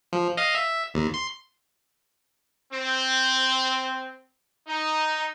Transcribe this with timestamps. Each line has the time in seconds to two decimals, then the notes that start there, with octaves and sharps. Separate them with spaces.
0.13 F3
0.37 D#5 F5
0.55 E5
0.94 D#2
1.14 C6
2.73 C4
4.68 D#4